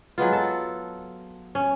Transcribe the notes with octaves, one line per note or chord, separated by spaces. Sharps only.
F#3 G#3 B3 F4
A4
C#4